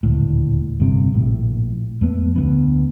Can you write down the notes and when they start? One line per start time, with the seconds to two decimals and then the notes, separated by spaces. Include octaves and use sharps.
0.03 D#1 G#1 D2 A2
0.80 G1 G2 C3
1.14 A#1 A2
2.01 F2 A3 B3
2.36 D2 A3 B3